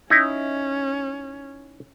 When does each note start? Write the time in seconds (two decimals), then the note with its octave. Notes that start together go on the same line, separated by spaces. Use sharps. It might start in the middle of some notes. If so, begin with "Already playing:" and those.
0.10 C#4 D#4 E4